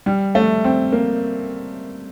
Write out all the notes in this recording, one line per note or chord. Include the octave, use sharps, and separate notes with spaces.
G3
A3
C4
A#3